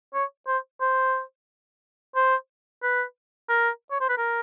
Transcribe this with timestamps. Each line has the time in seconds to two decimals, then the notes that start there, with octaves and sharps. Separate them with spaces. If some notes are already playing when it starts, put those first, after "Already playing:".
0.14 C#5
0.48 C5
0.81 C5
2.15 C5
2.83 B4
3.50 A#4
3.91 C#5
4.01 C5
4.09 B4
4.18 A#4